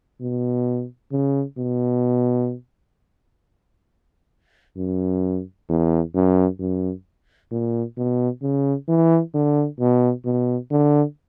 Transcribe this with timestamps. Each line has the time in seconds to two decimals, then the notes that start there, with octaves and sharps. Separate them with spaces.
0.21 B2
1.12 C#3
1.58 B2
4.77 F#2
5.69 E2
6.15 F#2
6.59 F#2
7.51 A#2
7.97 B2
8.42 C#3
8.88 E3
9.34 D3
9.80 B2
10.25 B2
10.71 D3